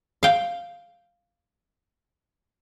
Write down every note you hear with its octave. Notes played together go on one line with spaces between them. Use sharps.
F5 G5